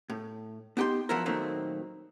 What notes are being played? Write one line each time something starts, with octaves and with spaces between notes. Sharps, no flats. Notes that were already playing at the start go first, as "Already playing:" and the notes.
A2
B3 D#4 G4 G5 C6
F3 F#3 B3 E4 A#4
A#2 D#3 F#3 A3 A#3 C4